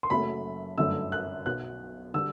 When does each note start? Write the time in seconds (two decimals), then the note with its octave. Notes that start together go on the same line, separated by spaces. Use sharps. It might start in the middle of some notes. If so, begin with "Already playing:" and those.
0.03 C6
0.10 F#1 F#2 F#3 A3 B5
0.78 G1 F#2 D3 A3 E6
1.12 F#6
1.46 B1 B2 F#3 F#6
2.14 D3 G3 E6